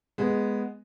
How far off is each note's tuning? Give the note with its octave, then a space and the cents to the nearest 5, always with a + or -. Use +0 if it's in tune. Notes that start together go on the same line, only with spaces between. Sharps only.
G#3 +0 B3 +0